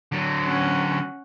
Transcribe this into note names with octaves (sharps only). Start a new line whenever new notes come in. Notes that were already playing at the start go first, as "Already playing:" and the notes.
D3 F#3
C#4 F#5